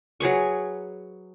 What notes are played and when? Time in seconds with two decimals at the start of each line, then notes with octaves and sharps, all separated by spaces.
0.20 F#3 G#4 B4 C#6